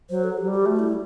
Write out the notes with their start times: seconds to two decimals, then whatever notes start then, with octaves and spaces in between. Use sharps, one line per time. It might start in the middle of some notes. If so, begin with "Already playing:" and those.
0.10 F#3 C5
0.24 A4
0.37 F#3 G4
0.47 G3 G4
0.65 A3 F#4
0.79 E4